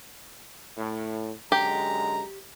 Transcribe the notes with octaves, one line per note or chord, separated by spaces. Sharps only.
A2
F#2 D3 G#3 G4 A#5